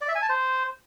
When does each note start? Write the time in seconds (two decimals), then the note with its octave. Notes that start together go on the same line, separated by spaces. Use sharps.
0.01 D5
0.08 E5
0.15 G#5
0.22 A5
0.29 C5